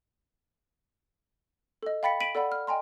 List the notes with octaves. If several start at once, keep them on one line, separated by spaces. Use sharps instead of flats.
A4 D#5
F5 G5 B5 A6 B6 C#7
B6 D7 D#7 F#7
A4 D5 F#5 B5
F6
D#5 G5 G#5 A#5 C6